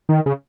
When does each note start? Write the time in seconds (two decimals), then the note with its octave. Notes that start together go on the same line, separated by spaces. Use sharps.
0.09 D#3
0.26 C#3